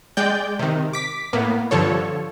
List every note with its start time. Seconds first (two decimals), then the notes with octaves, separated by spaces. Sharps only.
0.17 G#3 D5 G5 G6
0.59 C3 D#3
0.93 D6 B6
1.33 A2 A#3 B3
1.71 G2 D3 F3 A4 C#5